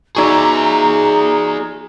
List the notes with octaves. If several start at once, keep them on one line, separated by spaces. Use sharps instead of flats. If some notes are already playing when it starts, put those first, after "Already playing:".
D#4 F#4 G#4 D5 A#5